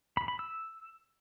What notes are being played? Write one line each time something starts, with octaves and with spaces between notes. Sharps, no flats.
B5
B5
E6